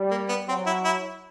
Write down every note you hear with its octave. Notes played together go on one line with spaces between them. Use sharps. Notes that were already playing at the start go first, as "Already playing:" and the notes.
Already playing: G3
A#3
B3
F#3 C4
E4
E4